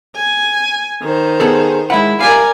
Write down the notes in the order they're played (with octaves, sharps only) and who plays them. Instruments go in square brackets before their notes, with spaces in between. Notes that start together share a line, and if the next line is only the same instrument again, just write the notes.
[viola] G#5
D#3 C5
[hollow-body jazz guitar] B3 G#4 A4
[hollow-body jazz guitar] G#3 F#5 [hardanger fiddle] E4
[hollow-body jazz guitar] G3 E5 F5 [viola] A#4 D5 [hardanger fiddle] G#5